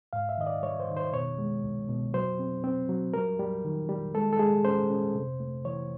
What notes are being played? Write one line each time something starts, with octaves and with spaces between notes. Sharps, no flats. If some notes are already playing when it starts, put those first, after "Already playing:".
G#2 F5
E5
D#3 D#5
D5
G3 C#5
C5
D#3
C5
B2 C#5
G#3
C2
B2
F#3 C5
C4
C4
F#3
G3 A#4
G3
D#3
G3
G#3 A4
A4
G#3 G#4
C#4 C5
C#4
C3
A3
E3 C#5